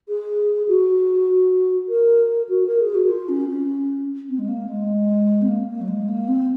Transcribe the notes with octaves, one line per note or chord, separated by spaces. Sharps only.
G#4
F#4
A#4
F#4
A#4
G#4
F#4
F4
C#4
C#4
C4
G#3
A#3
G#3
C4
A#3
A#3
F#3
G#3
A#3
C4